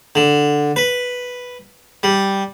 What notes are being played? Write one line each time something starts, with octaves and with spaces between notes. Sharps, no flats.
D3
B4
G3